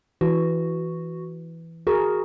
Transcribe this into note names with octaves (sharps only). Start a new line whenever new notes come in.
E3 F#4
F#4 G#4 A#4